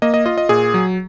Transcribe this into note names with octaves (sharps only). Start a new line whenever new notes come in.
A#3 D#5
D#5
F4 D#5
D#5
A#2 G#4
F#3